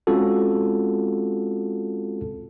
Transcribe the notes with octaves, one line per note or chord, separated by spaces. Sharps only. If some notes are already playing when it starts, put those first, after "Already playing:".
G#3 C4 C#4 F4 F#4 A4